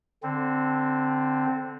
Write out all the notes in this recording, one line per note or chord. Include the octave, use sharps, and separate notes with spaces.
D3 C4